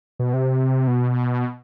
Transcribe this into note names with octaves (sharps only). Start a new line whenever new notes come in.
B2
C3
B2